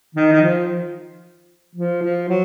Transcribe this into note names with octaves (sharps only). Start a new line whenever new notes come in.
D#3
D#3
F3
F3
F3
F#3